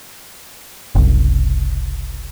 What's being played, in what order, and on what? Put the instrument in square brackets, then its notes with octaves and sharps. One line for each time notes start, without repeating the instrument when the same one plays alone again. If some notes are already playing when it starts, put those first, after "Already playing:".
[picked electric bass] F#1 C2